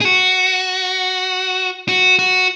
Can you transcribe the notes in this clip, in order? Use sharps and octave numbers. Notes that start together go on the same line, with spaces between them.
G#4
F#4
F#4
F#4